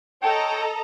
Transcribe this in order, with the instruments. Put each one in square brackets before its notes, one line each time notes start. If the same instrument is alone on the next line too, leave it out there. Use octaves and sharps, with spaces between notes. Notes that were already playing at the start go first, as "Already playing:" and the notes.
[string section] A4 D#5 A#5 [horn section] C#5 G5